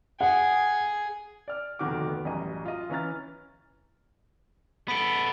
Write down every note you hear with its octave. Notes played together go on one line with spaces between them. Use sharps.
G#4 F#5
D5 F6
F1 D2 B2 D#3 F#4 D6
B3
A1 F#2 G3 D#5 A#5
F4 D#5
E3 C#4 A#5 F6 A6
B3 A4 B5 B6 D7